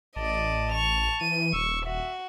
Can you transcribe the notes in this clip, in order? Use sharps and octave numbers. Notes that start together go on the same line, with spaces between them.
A1 D5 D#5 A5
C#6 F7
E3 D#7
D#1 C#6 E6
F#4 E5